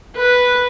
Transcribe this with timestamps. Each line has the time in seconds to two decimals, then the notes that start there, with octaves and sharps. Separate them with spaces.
0.17 B4